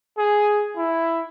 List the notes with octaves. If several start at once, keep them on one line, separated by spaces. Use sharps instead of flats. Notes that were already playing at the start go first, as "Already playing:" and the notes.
G#4
E4